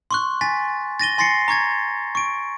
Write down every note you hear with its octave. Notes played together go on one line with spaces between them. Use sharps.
C6 C#6 F#6
G#5 A6 B6
A6 A#6 D#7 G7
G#5 C6 A6 A#6 C7 C#7
A#5 C#6 G#6 A6
C#6 D7